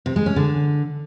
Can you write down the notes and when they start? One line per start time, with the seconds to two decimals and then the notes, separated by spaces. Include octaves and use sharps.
0.06 C3
0.16 G#3
0.26 C#4
0.36 D3